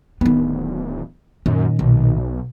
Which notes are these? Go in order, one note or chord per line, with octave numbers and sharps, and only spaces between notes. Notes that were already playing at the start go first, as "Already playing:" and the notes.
D1 D#3 B3
F#2 A#2 D#3 C#4
B1 B2